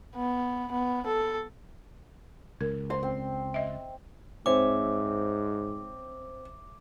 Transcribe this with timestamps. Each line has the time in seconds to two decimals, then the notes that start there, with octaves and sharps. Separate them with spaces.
0.16 B3
0.72 B3
1.07 A4
2.61 C#2 A#4
2.90 C5 C6
3.03 C4
3.54 D#5 E5
4.46 G#2 C4 C#5 E5 G#5 D6